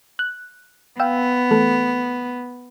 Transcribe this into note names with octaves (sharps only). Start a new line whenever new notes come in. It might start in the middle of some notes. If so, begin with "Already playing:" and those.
F#6
B3 F5 G5 E6
E3 A3 A4